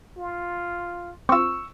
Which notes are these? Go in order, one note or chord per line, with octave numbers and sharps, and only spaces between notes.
F4
C4 F4 C#6 E6